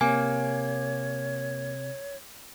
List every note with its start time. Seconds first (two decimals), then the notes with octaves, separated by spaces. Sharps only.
0.01 C3 A#3 C#5 G#5